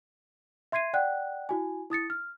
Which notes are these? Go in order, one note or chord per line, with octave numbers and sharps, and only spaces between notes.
E5 C6 G#6 C7 D#7
D5 F#5 G5 F#6
E4 F#4 G#5
E4 D#6 A6 C#7
F6